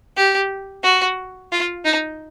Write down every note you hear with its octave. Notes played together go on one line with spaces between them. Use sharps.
G4
F#4
F4
D#4